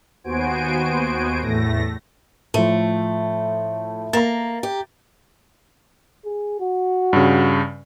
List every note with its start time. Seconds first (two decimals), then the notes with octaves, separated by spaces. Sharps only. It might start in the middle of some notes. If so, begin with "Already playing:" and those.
0.24 D#2 B3 F#4 C5 G#5 D7
1.41 E2 A2 A3 A#6
2.54 A2 F3 A3
4.13 A#3 A#5 A6
4.63 G4
6.25 G#4
6.60 F#4
7.13 G2 C#3